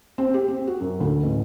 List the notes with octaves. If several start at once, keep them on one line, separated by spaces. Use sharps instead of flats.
C4
G4
C4
F#4
F#2
D2
A1